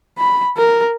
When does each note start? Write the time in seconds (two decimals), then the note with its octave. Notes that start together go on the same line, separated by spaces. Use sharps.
0.18 B5
0.57 A#4